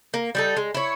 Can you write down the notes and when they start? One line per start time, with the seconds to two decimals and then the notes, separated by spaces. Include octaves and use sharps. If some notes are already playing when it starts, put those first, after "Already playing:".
0.14 A#3
0.35 G3 D#4 A4
0.56 G#3
0.74 E4 C#5